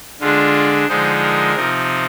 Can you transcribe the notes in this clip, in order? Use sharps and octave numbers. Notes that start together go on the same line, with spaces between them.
D3 G#3 D4 F4
D3 F3 G#3 D#4 C5
A#4
C3 F3 C4 D#4